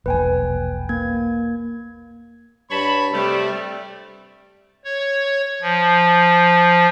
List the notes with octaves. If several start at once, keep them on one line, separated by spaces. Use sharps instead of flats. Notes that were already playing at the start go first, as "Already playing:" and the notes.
E1 A#1 A#2 B4 G5 G#5
A#3 G#6
G2 C#5 A5 B5
C3 G3 A3
C#5
F3